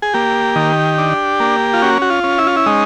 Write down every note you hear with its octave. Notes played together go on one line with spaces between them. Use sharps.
G#4
A#3 G4
D#3
D4
A#3
F4
C#4 F#4
F#4
F4
C#4
E4
F4
E4
G#3 D#4